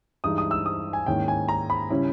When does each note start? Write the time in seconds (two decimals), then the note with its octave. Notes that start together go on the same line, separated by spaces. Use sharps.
0.24 G2 E3 G#3 D#4 D#6
0.38 D#6
0.51 E6
0.66 D#6
0.93 G#5
1.06 G#2 D#3 A#3 C#4 E4 G5
1.28 G#5
1.49 A#5
1.70 B5
1.90 C#3 G3 C#4 E4